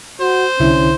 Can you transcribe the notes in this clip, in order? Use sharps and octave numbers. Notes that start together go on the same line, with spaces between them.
F#4 C5
C2 D3 C#4 E4